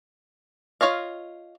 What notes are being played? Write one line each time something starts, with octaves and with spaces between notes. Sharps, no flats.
F4 C#5 D#5 F5